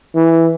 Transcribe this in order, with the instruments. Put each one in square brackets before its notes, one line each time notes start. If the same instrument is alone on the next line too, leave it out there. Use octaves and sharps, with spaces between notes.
[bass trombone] E3